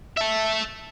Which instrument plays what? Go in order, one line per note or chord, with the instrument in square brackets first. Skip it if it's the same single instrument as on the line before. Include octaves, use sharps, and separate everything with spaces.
[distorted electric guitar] E5 A5